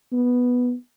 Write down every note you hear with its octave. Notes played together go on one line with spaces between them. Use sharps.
B3